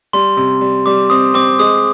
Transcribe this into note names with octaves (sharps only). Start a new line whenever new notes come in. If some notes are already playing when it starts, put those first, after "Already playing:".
G3 C6
C3
G3
G3 D6
C4 D#6
C4 D6
G#3 D#6